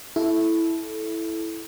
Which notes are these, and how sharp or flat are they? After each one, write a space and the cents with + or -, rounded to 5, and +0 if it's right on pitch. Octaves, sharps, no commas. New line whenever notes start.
E4 +0 A4 -15